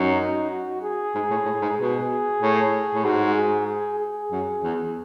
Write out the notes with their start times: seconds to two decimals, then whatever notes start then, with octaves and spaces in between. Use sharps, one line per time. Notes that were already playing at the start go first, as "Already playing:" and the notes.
Already playing: F#2 D#4
0.50 F#4
0.82 G#4
1.15 G#2
1.31 A2
1.45 A2
1.62 G#2
1.78 B2 G#4
2.41 A2
2.94 A2
3.05 G#2 F#4
3.36 G#4
3.68 G#4
4.00 G#4
4.32 F#2
4.64 E2